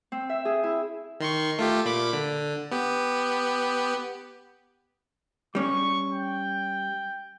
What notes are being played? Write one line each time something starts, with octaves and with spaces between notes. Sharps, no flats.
C4
E5
G#4
E4
D#3 C6 C#6
A3 F4 G4
A#2 B5 D6
D3
B3 G4
G3 C#4 C#6
G5